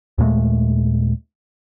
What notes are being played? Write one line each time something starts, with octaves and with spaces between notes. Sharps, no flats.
D#2 A#2 G#3 A3